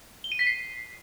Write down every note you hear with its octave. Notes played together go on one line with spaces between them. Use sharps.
G7
D#7
B6
C7